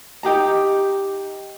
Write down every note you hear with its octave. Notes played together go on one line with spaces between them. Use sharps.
D#4 G4 G#4 A#5